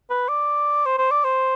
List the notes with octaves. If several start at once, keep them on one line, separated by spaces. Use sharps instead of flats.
B4
D5
C5
C5
D5
C5